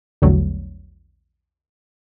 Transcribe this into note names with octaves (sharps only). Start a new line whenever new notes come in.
A#1 E2 D3 F#3 G3 A3